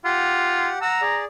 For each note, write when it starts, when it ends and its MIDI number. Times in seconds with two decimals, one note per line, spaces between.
0.05 0.70 65
0.05 0.79 67
0.05 0.79 78
0.81 1.01 78
0.81 1.18 82
0.81 1.01 88
1.02 1.25 68
1.02 1.25 74